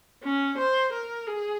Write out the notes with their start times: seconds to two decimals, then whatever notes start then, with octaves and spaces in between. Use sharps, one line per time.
0.24 C#4
0.58 C5
0.93 A#4
1.27 G#4